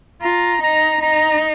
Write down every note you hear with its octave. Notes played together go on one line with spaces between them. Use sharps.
F4 A#5
D#4 A#5
D#4 A#5